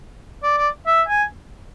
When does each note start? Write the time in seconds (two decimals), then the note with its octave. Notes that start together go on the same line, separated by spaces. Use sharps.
0.43 D5
0.58 D5
0.87 E5
1.08 G#5